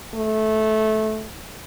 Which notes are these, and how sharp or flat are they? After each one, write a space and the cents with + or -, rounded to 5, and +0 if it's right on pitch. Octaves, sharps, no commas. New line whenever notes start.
A3 -15